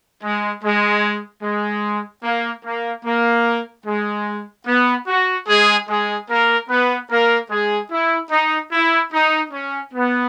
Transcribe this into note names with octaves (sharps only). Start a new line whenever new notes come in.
G#3
G#3
G#3
A#3
A#3
A#3
G#3
B3
F#4
G#3 G#4
G#3 G#4
A#3 A#4
B3 B4
A#3 A#4
G#3 G#4
E4
D#4
E4
D#4
C#4
B3